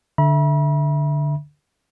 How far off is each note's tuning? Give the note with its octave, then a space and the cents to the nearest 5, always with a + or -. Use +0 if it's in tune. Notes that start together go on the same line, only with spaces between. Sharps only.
D3 +0 E5 +0 B5 -40